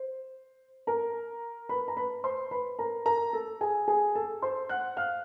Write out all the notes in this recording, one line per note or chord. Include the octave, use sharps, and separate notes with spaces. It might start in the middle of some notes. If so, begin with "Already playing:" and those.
Already playing: C5
A#4 A#5
B4 B5
A#5
B4 B5
C5 C6
B4 B5
A#4 A#5
A#4 A#5
A4 A5
G#4 G#5
G#4 G#5
A4 A5
C5 C6
F#5 F#6
F5 F6